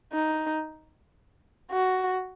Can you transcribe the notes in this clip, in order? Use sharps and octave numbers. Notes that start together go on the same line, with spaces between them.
D#4
F#4